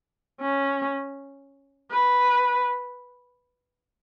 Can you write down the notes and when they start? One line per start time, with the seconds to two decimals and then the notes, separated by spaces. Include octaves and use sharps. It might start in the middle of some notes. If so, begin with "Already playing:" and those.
0.42 C#4
1.91 B4